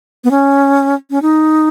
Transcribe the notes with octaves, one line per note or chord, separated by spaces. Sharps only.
B3
C#4
C#4
D#4